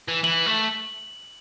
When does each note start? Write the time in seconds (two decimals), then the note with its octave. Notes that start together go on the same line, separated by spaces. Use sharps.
0.08 E3
0.23 E3 F#7
0.46 A3